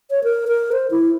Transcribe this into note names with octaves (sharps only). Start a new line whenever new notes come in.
C#5
A#4
A#4
C5
E4